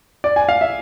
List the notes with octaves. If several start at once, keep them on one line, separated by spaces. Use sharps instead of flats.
D5
G#5
F5
E5